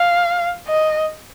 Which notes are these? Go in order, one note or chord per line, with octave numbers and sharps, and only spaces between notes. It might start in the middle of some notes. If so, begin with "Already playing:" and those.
Already playing: F5
D#5